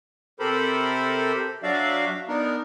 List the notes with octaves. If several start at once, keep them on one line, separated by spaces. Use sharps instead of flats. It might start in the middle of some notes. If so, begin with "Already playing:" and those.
C3 G4 A4 A#4 C5 B5
F#3 D4 F#4 D5 E5 F5
B3 D4 D#4 A#4